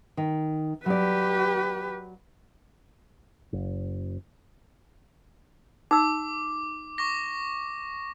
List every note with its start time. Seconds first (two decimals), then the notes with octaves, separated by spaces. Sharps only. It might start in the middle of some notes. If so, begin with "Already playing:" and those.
0.17 D#3
0.86 F#3 G4 B4 D5
3.53 F#1
5.91 D#4 D6 E6
6.98 C#6 D6 A#6